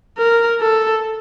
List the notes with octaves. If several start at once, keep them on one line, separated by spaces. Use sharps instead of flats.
A#4
A4